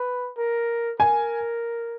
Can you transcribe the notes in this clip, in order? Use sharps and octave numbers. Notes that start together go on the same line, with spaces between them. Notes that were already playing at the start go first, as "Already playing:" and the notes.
Already playing: B4
A#4
A#4 G#5